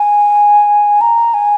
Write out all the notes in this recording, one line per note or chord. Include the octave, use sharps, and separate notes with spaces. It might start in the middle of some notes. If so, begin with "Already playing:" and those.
Already playing: G#5
A#5
G#5